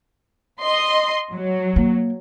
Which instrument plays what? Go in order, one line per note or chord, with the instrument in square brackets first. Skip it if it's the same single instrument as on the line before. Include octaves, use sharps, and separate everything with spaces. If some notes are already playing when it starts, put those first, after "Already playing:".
[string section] D#5 C6
F#3
[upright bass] A#3